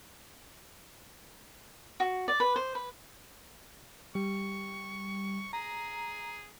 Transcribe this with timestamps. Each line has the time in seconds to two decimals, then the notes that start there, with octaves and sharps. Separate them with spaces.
2.00 F#4
2.28 D5
2.40 B4
2.56 C5
2.75 B4
4.15 G3 C#6
5.53 G#4 A#5